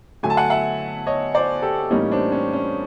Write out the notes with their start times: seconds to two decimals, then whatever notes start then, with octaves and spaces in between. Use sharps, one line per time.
0.23 D3 F#3 A3 G#5
0.30 A5
0.37 F#5 G#5
0.50 E5 F#5
1.07 C#5 D#5
1.34 C5 D5
1.62 G4 A4
1.90 A2 E3 G3 A#3 C#4 D#4
2.11 C4 D4
2.32 C#4
2.53 C#4